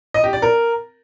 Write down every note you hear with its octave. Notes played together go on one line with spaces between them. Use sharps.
D#5
G4
D5
A#4